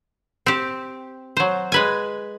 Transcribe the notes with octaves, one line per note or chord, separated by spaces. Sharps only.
C4 G4
F#3 C5
G#3 B4 G#5